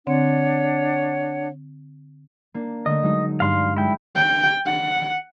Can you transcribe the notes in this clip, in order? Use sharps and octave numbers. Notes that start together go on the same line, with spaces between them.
D3 C4 D4 C#5 F#5
A#3 D4
D3 A3 D#5
F#3 G#3 D#4
G2 D4 F5 C6 F6
G#3 E4 G5
G5
F#5